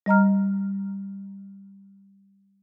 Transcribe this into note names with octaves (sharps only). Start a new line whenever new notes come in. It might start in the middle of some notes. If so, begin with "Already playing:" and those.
G3 D#5 A#5 F6